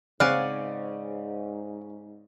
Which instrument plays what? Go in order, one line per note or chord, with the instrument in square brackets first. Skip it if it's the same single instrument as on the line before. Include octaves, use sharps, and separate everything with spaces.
[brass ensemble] G#2 [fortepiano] C#3 C4 C#4 [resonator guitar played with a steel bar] D5 [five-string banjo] F5 F#5 G#5